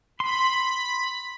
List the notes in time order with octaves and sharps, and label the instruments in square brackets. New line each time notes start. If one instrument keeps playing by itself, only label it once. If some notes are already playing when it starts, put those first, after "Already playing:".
[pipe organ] B5 [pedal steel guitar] C6